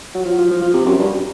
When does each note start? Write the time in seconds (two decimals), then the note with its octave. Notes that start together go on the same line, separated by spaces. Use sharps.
0.14 F#3
0.25 F3
0.38 F3
0.50 F3
0.62 F3
0.73 C3
0.85 F#2
0.98 G2